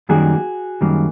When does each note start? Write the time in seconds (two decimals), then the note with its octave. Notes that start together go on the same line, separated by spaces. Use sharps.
0.09 F#2 D#3 G3 A#3 F#4 G#4
0.81 F#2 D#3 G3 A#3